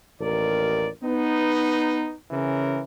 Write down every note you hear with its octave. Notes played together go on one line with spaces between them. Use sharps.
A1 D#2 A#4 D5
B3 D#4
C#3 E3 C#4 A#4